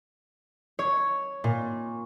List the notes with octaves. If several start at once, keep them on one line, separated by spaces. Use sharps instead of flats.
C#5
A#2